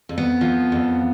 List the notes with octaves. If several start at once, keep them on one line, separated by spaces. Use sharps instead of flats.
F2
B3
F3
F2